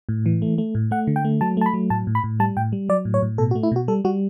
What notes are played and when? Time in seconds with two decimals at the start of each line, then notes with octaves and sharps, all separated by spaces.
0.09 A2
0.26 E3
0.42 A3
0.58 A3
0.75 A2
0.91 A3 F#5
1.07 D3
1.16 G5
1.25 A3
1.41 F#3 A5
1.57 A3 A5
1.66 B5
1.74 F#3
1.90 A2 A5
2.07 A2
2.15 B5
2.24 A2
2.40 G3 A5
2.57 A2 G5
2.72 G3
2.89 F#3 D5
3.05 A2
3.14 C#5
3.22 A2
3.38 B2 A4
3.51 F#4
3.55 A3
3.63 E4
3.72 B2 F#4
3.88 G3 A4
4.05 G3 F#4